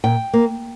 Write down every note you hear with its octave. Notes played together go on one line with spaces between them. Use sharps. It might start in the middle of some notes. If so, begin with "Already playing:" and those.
A#2 G5
A#3